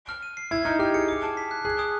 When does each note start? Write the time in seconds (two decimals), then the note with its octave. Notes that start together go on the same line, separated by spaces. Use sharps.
0.09 F6
0.22 D#7
0.37 C7
0.51 E4 G#6
0.65 D#4 F6
0.79 G4 F6
0.94 G#4 C#7
1.08 D6
1.23 A5
1.37 B6
1.51 F#6
1.65 G#4 F#6
1.79 D#6